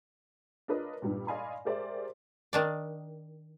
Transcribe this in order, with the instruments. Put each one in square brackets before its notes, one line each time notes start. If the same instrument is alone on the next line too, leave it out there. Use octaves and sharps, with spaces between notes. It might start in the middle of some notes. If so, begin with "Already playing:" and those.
[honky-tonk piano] D4 F4 A#4 B4 C#5 D#5
G2 A#2 G3 B3 D4 D#4
D5 D#5 F5 G#5 B5 C6
G4 G#4 A#4 C5 D5 E5
[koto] D#3 D4 D5